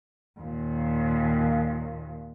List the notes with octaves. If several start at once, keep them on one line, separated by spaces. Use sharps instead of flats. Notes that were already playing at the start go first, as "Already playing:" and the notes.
D#2 A#2